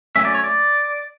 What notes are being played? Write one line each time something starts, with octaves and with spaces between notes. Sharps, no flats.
F#3 A3 C#4 E5
D5
C#5
D5